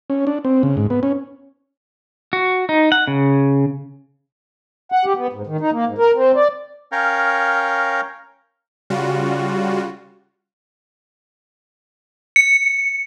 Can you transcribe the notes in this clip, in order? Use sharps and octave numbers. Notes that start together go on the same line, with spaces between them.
C#4
D4
C4
C#3
G#2
B3
C#4
F#4
D#4
F#5
C#3
F#5
G4
B3
G#2
D#3
D#4
A#3
G#2
A#4
C4
D5
C#4 A#4 C#5 F5 G5 A#5
C#3 G3 F4 F#4
C#7